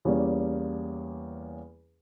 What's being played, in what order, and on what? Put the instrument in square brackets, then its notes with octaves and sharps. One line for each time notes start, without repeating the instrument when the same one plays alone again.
[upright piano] E2 G3 A#3 C#4